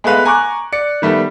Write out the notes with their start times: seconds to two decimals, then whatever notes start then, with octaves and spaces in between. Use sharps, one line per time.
0.04 G#3 A3 B3 B4 F5
0.25 G#5 A#5 C#6 D6 F#6
0.72 D5 C#7
1.02 D#3 G3 A3 B3